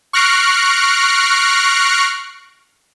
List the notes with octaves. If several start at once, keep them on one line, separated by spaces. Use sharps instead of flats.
C#6 F6 F#6 A#6 C7 D7